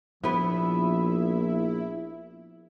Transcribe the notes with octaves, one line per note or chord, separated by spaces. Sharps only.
A#1 F3 B3 E4 B4